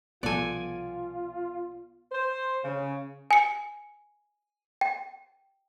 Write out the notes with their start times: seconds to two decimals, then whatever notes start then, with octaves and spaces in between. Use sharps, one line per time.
0.23 C2 B2 F3 B3 F4 A4 D5 G#5
2.12 C5
2.63 C#3
3.31 G#5 C#7
4.81 G5